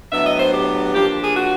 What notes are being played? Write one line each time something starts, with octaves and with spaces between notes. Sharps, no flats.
A2 F#3 B3 D4 E5
D#5
C5
G4
F3 A#3 D4 G4
G#4
F#4